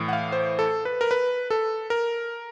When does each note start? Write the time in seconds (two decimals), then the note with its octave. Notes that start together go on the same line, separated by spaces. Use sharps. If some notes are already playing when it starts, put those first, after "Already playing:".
Already playing: A2 E3
0.08 F#5
0.13 F5
0.32 C5
0.59 A4
0.85 B4
1.01 A#4
1.11 B4
1.50 A4
1.90 A#4